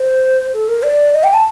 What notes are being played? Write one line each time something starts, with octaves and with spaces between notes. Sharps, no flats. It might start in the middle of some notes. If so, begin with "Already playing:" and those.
Already playing: C5
A4
A#4
D5
D#5
G5
A5